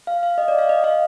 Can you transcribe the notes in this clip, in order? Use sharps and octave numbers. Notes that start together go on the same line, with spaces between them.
F5
F5
D#5
D5
F5
D#5
F5